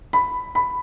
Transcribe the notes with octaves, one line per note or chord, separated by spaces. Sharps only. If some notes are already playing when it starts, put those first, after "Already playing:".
B5
B5